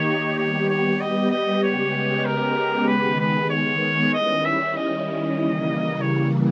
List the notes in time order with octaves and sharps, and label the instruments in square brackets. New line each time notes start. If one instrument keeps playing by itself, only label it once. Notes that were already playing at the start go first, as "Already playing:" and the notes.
Already playing: [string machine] D#3 A#3 D#4 G4 [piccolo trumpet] C#5
[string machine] G3 B3 G4 [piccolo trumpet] C#5
[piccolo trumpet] C#5
D#5
D#5
[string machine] C#3 G#3 B3 G4 [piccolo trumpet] C#5
[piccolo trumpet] A#4
[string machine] D#3 G#3 B3 [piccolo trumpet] B4
[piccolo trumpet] B4
C#5
[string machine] D#3 G3 C#4 E4 [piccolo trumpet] D#5
[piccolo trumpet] E5
D#5
[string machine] C#3 E3 G3 A#3
[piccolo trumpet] C#5